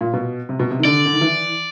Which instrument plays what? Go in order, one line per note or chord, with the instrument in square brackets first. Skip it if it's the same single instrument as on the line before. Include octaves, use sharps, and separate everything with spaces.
[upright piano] A#2
B2
C3
B2
C3
D#3
[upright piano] D3 [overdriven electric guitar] D5
[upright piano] D3
D#3
E3